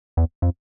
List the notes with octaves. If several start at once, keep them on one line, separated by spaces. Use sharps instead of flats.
E2
F2